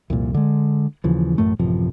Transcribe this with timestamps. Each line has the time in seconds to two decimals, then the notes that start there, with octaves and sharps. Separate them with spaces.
0.10 C2 F2 A#2
0.34 D3 G#3
1.04 D#2 C#3 E3 F3
1.38 A1 F#2 A2 A3
1.59 A1 F#2 C3 F3